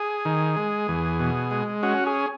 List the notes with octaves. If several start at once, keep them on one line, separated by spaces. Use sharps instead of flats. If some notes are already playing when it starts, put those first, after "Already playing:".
Already playing: G#4
D#3
G#3
E2
B2
G#3
C#4 F#4
G#4